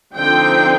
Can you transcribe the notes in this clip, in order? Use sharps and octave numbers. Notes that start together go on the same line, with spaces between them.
D3 F3 C4 D#4 G5